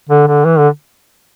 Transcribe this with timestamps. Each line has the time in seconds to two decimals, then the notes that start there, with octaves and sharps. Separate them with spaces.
0.09 D3
0.27 D3
0.45 E3
0.58 D3